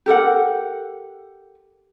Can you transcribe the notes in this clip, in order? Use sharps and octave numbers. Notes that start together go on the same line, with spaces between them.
G4 A4 A#4 F#5